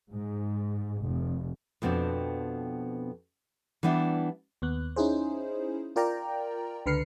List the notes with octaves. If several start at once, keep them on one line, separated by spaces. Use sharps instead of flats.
G#2
F1
F2 B2 B3 C4 D4
E3 G3 B3 D4 E4
D#2 B3 F#6
C#4 D#4 E4 G#4 C5
F4 A#4 D5 G5 A#5
C#2 D3 B4 F6 C7 C#7